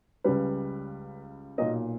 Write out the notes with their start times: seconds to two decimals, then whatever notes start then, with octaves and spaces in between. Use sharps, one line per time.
0.24 C#2 C#3 G3 B4
1.58 B1 A#2 A#3 D#5